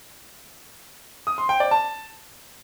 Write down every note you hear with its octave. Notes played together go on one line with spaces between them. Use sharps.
D#6
C6
G5
D5
A5